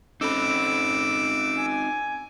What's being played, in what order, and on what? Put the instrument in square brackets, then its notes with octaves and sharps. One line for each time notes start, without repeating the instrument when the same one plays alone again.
[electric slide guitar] C4 D#4 [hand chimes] C#4 A4 B5 [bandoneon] D6 E6
[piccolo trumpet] G#5